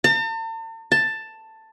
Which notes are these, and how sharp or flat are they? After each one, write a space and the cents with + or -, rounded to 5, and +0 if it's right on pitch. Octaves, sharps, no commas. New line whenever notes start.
A5 +45
A5 +10